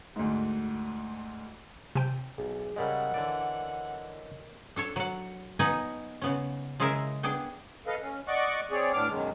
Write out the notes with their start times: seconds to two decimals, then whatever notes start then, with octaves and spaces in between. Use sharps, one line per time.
0.16 D2 G#2
1.95 C3 G5
2.38 B1 G#4
2.76 C#3 G3 G#3 A#4 C#5 D#5 F#5
3.14 D3 E3 D5
4.76 D4 A4 C#5
4.96 F#3 F#5
5.59 B3 D#4 B4 C#5 F#5 G#5
6.22 C#3 B3 C#4
6.80 C#3 G#3 E4 G#4 A#4 E5
7.23 B3 D4 G#4 G5
7.87 A4 B4 D#5 F5
8.01 C#4
8.28 D5 D#5 F#5 C#6 D6 F#6
8.71 C4 G#4 C#5 D5
8.93 A2 B3 D4 D6 F6
9.08 F#2 B2 D#3 F#3 G#3